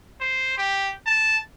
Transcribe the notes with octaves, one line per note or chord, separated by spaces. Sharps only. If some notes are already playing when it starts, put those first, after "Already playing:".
C5
G4
A5